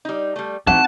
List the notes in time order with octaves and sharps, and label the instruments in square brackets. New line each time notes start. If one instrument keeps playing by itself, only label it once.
[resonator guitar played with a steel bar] G3 D#4
G3 A3
[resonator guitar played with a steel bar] E3 F#3 A3 [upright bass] C4 D#4 [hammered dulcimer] F#5 [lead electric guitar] A5